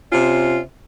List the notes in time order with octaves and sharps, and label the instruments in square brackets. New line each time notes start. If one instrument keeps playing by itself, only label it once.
[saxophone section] C3 C#4 F4